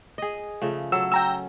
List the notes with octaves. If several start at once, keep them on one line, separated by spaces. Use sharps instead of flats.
G#4 D#5
C#3 F3 A3
F#3 A4 E6
C#4 G5 A#5 E6